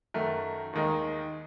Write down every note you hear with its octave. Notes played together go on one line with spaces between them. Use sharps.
F#2 D#3 A3
D#2 D#3 G#3 D#4